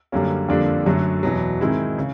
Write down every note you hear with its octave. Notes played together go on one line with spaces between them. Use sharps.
F#2 D3 G3 A#3 C#4
F2 D3 G3 A#3 D4
F#2 D3 F#3 A3
E2 B2 F#3
G#2 D#3 G#3 C4 E4
C#3